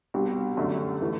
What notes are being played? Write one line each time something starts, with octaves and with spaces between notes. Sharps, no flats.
C2 B2 G3 D4
F#2 D3 A3 D4
E3 A3 E4